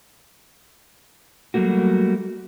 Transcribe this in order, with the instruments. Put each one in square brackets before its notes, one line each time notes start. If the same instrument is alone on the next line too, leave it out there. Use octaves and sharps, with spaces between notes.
[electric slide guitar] F#3 G3 A3 A#3 F#4